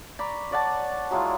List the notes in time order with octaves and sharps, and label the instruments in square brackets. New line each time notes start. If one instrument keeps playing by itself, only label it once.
[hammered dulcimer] D5 A#5 B5 C#6
C#5 D5 F#5 A5
F#3 G#3 E4 F4